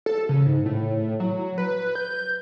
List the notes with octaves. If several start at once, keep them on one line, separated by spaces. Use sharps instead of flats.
A4
C#3
G#2
A2
F#3
B4
G6